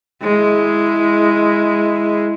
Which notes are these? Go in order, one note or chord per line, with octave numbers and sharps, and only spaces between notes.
G#3 E4